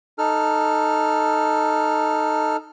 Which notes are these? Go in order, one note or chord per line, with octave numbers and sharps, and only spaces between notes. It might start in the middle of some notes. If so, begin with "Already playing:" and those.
D#4 A4 F6